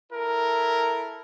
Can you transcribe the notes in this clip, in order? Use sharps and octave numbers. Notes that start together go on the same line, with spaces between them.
E4 A4 A#4